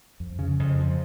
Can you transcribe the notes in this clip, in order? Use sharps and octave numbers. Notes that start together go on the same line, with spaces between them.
F2
C#3
F2
F3